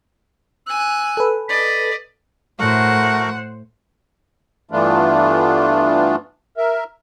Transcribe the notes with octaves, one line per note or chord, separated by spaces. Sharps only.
G#5 E6 F#6
A4 B4
D5 D#5 B6
A2 A3 F#4 A#4 C5 F#5
G2 E3 A3 B3 D4 F4
A#4 E5